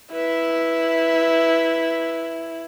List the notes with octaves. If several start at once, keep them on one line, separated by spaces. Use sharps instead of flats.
E4 B4 E5